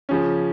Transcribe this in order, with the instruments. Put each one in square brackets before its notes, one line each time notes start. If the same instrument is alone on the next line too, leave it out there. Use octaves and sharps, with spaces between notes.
[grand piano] C#3 F3 C#4